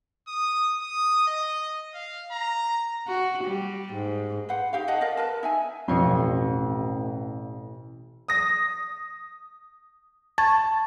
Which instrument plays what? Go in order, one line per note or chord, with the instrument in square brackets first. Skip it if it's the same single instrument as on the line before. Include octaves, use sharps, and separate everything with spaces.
[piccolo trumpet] D#6
D#6
D#5
F5
A#5
[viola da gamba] F#4
G3
G#2
[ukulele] B4 C5 F#5
D#4 G4 F5
D#4 D#5 F#5 A5
A#4 D5 D#5 F5
A#4 B4 A5
D#4 E5 G#5
[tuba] A1 [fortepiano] F2 [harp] B2 C#5 C6
[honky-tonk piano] D#6 A#6
[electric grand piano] A5 [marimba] C#6 G#6 A6